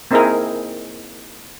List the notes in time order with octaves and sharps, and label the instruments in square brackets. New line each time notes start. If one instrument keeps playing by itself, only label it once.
[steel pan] A#3 C4 D#4 E4 G#4 A#4